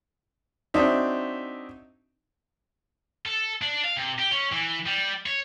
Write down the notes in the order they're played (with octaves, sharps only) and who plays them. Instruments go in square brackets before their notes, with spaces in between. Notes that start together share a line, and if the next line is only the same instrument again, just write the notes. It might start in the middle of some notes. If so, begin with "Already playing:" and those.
[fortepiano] F#3 C4 D4 D#4 E5
[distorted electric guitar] A4
D4
F5
C3
G4
C#4
E3
G3
C#5